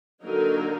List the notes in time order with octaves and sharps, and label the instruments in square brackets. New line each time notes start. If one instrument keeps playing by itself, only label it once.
[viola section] D3 F#3 A#3 D#4 A#4